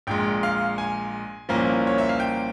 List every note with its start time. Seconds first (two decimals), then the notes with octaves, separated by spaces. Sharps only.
0.07 A#1 A#2 G#3 G5
0.43 F5
0.78 G#5
1.49 C2 A#2 F3 A#3 C#4
1.87 C#5
1.98 E5
2.09 F5
2.20 G5